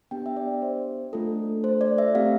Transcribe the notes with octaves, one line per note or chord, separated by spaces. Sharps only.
B3 D4 G4 G5
E5
D5
C5
A3 D4 F4 A4
C5
D5
E5
A3 C4 G4 F5